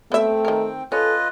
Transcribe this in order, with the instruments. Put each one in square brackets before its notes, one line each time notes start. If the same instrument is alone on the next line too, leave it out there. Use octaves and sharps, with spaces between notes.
[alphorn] A3 [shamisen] B3 E5 [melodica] C4 G5
[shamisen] D#3 A#4
[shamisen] C#4 [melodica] F4 B4 D#5 [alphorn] A4